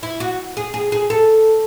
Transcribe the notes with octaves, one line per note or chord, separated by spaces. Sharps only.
E4
F#4
G#4
G#4
G#4
A4